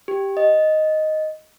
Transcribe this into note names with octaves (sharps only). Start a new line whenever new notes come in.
G4
D#5